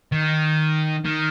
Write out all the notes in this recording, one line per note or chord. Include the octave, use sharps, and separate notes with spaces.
D#3
D#3